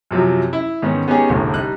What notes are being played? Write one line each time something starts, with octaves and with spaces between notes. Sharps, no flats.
F#2 C3 F3 F#3
E4
G#2 D#3 B3 C#4
B3 C#4 D#4 G4 G#4
E1 C2 A2 D3
G3 D#4 F#6